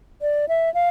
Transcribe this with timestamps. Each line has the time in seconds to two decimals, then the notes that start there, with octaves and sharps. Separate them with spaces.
0.22 D5
0.49 E5
0.74 F5